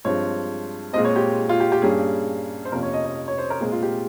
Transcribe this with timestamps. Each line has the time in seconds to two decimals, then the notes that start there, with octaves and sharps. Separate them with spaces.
0.05 G2 F3 G#3 C4 C#5
0.93 A#2 G#3 C4 D#5
1.05 C#5
1.16 G4
1.49 F4
1.60 G4
1.72 G4
1.82 G2 G3 A#3 C#4 G#4
2.65 C5
2.72 F2 C3 F3 A#3 C#4 A#4
2.83 C#5
2.93 D#5
3.05 D#5
3.28 C#5
3.38 C5
3.50 A#4
3.60 A#2 G#3 C4 G#4
3.72 F4
3.83 G4